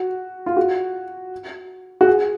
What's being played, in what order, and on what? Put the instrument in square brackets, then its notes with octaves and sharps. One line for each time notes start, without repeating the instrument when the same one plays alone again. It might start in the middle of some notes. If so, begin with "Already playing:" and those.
Already playing: [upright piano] F#4
F4
F#4
F#4
G#4